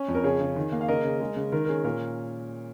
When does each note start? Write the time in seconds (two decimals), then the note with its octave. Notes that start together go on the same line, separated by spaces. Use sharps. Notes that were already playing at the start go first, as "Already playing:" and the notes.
Already playing: C#4
0.08 F2
0.15 A#4
0.24 C#3 G#4 C#5
0.41 C#3
0.56 D#3
0.72 A#3
0.81 F5
0.88 C#3 A#4 D#5
1.04 C#3
1.20 G#3
1.36 C#3
1.52 D#3 A#4
1.65 A#4
1.69 C#4 G#4
1.84 A#2 A#4